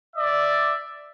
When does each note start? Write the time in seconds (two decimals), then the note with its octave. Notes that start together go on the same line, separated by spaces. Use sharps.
0.16 D5 E5